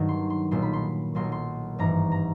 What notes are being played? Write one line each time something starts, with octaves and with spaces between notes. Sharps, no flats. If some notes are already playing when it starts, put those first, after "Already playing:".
Already playing: G2 D#3 F#3 A#3 D4
C6
C6
B1 A#2 F#3 C6
B5
C6
B1 A#2 F#3 C6
C#6
C6
G#1 G2 E3 A#5
A#5